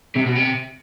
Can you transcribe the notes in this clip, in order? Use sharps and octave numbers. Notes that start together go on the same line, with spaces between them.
C3
B2
C3